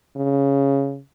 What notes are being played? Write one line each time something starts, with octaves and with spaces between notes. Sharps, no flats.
C#3